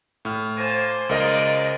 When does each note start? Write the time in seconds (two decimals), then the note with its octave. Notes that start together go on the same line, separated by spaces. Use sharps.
0.25 A2 F6
0.57 A#3 C5 G#5 A5
1.09 C#2 D#4 F4 A#4 D5 D#5